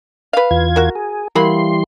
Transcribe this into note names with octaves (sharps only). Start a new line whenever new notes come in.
B4 F5
E2 F4 G#6
F#4 A#4
G#4
E3 F#3 G3 A#3 B5 C6